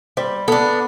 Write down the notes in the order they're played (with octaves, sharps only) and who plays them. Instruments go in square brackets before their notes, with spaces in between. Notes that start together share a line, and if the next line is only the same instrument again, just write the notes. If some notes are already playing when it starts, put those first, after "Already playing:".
[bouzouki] G3 [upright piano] C5
[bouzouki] B3 D4 [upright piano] A4